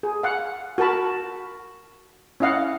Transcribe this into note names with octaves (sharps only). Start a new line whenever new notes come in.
G#4
F5 F#5
F#4 A#4 A5 B5
C#4 E4 D#5 F5 F#5